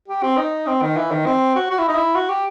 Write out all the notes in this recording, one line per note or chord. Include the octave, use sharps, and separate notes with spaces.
G4
C4
D#4
C4
D#3
E3
D#3
C4
F#4
F#4
E4
D#4
E4
F#4
G4